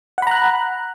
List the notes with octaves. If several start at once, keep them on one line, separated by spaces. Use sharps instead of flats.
F#5 A#5 B5 F#6